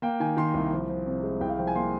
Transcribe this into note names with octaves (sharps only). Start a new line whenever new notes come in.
A#3 G5
D#3 G#5
D#3 C6
C2
F3
F3
C3
G#3
C2 G5
F5
F3 G5
G#5
A#3 C6